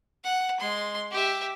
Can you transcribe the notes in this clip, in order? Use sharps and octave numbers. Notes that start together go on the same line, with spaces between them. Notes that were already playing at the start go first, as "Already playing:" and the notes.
F#5
G#3 C6
G4 E5